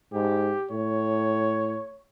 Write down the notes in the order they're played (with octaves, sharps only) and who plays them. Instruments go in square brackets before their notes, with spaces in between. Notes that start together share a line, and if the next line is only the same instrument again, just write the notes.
[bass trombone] G#2 [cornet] G4
[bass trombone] A2 [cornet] C#5